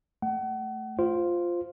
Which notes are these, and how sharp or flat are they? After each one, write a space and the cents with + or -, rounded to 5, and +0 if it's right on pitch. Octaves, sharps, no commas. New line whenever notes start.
A3 +0 F#5 +35
F4 +0 C5 -5